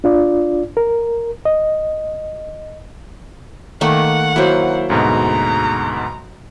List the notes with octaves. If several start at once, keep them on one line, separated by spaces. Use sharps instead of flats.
D4 F4 D5
A#4
D#5
D#3 A3 A#3 F#5
F#3 A#3 E4 C5
D2 G#2 B2 A#5